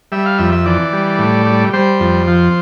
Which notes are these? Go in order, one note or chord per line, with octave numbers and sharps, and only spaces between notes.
G3 E5
F5
F2 E5
E5
E3 D5
G3
A2
G3
G3 C5
F2
F3